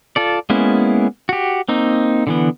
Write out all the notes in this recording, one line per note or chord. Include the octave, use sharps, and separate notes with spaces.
F4 A4 D5
G#3 A#3 B3 C#4 E4
F#4 G4
A#3 C4 D#4
D3 E3 B3